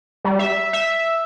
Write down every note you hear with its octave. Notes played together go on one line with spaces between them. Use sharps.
G3
E5
E5